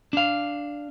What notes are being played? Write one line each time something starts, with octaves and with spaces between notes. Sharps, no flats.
D4 F5